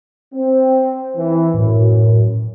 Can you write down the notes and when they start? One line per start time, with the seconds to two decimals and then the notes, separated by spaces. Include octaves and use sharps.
0.34 C4
1.17 E3
1.54 F#2 A2